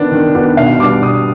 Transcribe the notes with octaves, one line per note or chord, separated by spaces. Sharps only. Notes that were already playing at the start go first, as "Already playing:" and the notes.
Already playing: D#3 B3 D4
D#3
B3 D4
B2 F5
G3 B3 D4 D6
B2 D#6